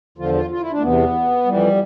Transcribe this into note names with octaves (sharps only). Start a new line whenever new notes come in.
E2 D3 F3 F4
F4
F4
E4
D4
A3
E2 C3 E3 B3
F2 E3 G3